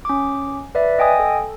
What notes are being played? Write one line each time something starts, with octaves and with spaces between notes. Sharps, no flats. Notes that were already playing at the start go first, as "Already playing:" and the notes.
C#4 D6
B4 D5 E5
D#5 G5 G#5 D#6
A4